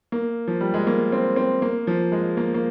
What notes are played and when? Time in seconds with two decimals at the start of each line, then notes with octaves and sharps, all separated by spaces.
0.12 A#3
0.48 F3
0.61 G3
0.74 G#3
0.87 A#3
1.12 C4
1.36 C4
1.62 A#3
1.87 F3
2.12 G#3
2.37 A#3
2.54 A#3